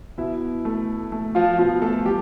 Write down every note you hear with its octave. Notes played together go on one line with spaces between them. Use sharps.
B2 E4 E5
A3
A3
F3 F4
B2 F3 F4
A3 A4
G3 G4